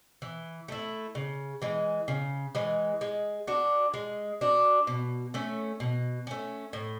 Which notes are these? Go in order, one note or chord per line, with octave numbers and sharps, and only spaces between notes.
E3
A3 E4
C#3
E3 G#3
C#3
E3 G#3
G#3
D4 F#4
G#3
D4 F#4
B2
A3 C#4
B2
A3 C#4
A2